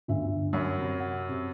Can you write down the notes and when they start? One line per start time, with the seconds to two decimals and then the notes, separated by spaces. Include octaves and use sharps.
0.08 G1 D2 E5
0.53 F#2 F#3 B5
0.78 C3
1.00 F#5
1.29 C3